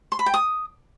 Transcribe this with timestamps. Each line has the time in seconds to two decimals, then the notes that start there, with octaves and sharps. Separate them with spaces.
0.12 C6
0.19 B5
0.26 G5
0.34 D#6